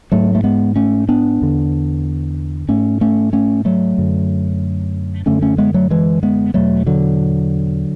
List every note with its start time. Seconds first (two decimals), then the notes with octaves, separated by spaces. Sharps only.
0.12 G#2 F#3 A3
0.35 A3
0.44 G#3 B3
0.76 A3 C#4
1.09 B3 D4
1.41 E2 D3
2.69 G#2 A3 C#4
3.01 A3 C#4
3.33 A3 C#4
3.65 F#3 A3
3.98 F#2 D3
5.26 F#2 D3 A3 C#4
5.42 A3 C#4
5.58 G#3 B3
5.74 F#3 A3
5.91 E3 G#3
6.23 G#3 B3
6.54 E2 B2 F#3 A3
6.86 D3 F#3